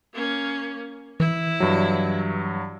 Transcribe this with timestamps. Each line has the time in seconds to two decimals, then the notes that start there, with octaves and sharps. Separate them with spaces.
0.14 A#3 C#4
1.20 E3 E4
1.60 G2 F#3